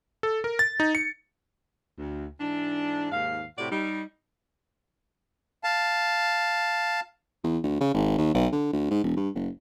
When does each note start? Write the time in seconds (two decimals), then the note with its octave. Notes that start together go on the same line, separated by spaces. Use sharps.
0.23 A4
0.44 A#4
0.59 A6
0.80 D#4
0.95 C#7
1.98 D2
2.41 G#2 E3 D4
3.11 D#2 G#2 F5
3.58 A2 C3 F#4 G4 D5
3.70 G3 D#4
5.64 F5 A5
7.44 E2
7.63 D2
7.81 C#3
7.94 G#1
8.18 D#2
8.34 B1
8.53 D3
8.73 D2
8.90 G#2
9.03 E1
9.16 G2
9.35 F#1